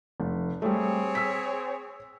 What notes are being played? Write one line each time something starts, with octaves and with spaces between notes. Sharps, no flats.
F1
G3 A3 C4 G#4 C#5
E6 B6